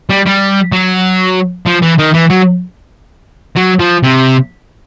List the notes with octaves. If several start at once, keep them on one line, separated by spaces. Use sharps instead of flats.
G3
G3
F#3
F3
E3
D#3
E3
F#3
F#3
F3
C3